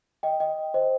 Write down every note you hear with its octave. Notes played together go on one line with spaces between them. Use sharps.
D#5 G5
D#5 G5
C5 D#5